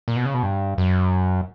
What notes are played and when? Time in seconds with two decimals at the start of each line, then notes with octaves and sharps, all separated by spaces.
0.08 A#2
0.16 B2
0.25 C#3
0.34 B2
0.43 G2
0.78 F#2